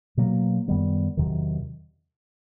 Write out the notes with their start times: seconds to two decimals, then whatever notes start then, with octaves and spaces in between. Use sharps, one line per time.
0.17 B2 F#3 A#3
0.68 F#2 D#3 G3 B3
1.17 E2 C3 D#3 F#3